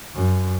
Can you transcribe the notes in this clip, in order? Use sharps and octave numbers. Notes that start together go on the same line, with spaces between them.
F#2